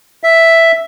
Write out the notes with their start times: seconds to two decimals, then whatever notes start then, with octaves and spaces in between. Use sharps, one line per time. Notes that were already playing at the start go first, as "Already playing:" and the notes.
0.24 E5